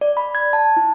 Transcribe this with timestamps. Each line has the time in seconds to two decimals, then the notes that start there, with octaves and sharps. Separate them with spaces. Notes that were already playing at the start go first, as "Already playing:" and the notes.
0.01 D5
0.17 B5
0.35 G#6
0.53 A5
0.77 E4